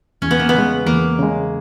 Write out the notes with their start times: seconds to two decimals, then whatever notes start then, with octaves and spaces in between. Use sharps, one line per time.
0.22 E2 C#4
0.31 B3
0.40 A#3
0.49 B3
0.54 C#3 G#3
0.87 E2 A#3
1.19 C#3 G#3